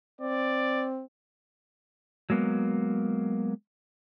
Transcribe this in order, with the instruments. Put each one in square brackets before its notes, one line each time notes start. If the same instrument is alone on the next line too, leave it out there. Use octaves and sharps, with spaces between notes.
[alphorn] C4 [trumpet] D5
[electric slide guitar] F#3 G#3 A#3 B3